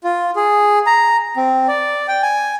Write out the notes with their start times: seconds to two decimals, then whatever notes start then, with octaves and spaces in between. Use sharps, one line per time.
0.04 F4
0.36 G#4
0.87 A#5
1.37 C4
1.68 D5
2.08 G5
2.23 G#5